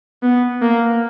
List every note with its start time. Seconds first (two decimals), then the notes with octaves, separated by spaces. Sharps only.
0.23 B3
0.62 A#3